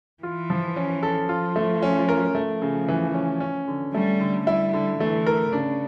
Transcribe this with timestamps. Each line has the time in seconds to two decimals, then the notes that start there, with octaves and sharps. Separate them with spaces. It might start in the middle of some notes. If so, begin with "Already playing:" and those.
0.23 E3 F4
0.50 F3
0.76 C#4
1.03 A4
1.29 F3 F4
1.56 A3
1.82 C#4
2.09 A#4
2.35 F3 A3
2.62 C#3
2.88 E3
3.14 C#4
3.40 C#4
3.68 D3
3.93 G3 A3
4.20 D3
4.47 G3 E4
4.73 D3
5.00 E3 A3
5.27 A#4
5.53 C#3 D4